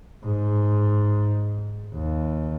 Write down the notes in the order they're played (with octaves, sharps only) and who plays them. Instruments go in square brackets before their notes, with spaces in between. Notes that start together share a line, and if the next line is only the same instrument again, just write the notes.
[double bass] G#2
D#2